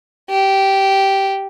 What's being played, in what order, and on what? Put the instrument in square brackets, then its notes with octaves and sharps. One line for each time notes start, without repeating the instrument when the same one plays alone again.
[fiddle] G4